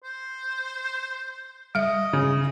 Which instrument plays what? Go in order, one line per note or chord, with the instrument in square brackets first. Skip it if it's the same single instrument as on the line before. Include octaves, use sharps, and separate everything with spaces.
[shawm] C5
[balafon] G3 E5 [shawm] D#5
[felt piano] C#3